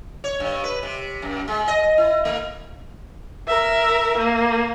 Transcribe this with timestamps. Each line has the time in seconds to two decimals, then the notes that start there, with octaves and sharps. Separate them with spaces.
0.24 C#5
0.40 G2
0.64 B4
0.83 C3
1.22 F#2
1.48 G#3
1.68 D#5
1.98 E4
2.25 A3
3.47 A#4 E5
4.18 A#3